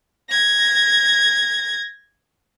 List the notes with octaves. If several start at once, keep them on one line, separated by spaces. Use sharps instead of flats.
G#6 A#6